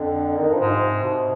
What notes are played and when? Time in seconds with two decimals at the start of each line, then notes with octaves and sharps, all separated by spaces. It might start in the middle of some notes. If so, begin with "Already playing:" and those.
Already playing: F2 D3
0.37 F2 D#3
0.48 G2
0.54 F3
0.60 G#2
0.71 C3
1.04 B2